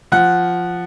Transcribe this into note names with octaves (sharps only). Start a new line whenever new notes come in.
F3 F#5